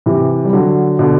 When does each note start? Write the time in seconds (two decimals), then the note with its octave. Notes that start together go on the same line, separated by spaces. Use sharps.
0.06 C3 E3
0.45 G3
0.53 D3 F#3
0.99 B2 D3